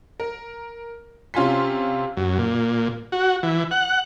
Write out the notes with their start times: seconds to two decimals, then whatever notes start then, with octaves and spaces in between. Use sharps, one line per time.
0.20 A#4
1.34 C3 C#4 F4 G#5 C6 B6
2.17 F#2
2.38 A#2
3.12 F#4
3.43 E3
3.71 F#5